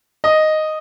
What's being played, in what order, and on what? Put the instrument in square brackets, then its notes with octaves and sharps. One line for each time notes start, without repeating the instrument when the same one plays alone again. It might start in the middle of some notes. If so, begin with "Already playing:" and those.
[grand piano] D#5